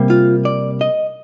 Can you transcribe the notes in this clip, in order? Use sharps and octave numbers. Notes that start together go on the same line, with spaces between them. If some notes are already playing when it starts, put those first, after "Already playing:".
Already playing: C3 G3 A#3
F4
D5
D#5